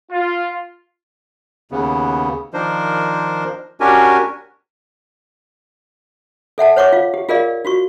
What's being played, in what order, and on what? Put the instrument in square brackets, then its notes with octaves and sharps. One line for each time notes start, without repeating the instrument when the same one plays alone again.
[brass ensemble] F4
[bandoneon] D#2 C#3 B3
D#3 F3 D4 A#4 C5
C#4 D4 F#4 G4 A#4 G#5
[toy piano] A4 E5 F#5 A5
C5 C#5 F#5 C#6 D6
F4 F5
G4
F4 G#4 A#4 D5 D#5 F5
F4 F#4 C#6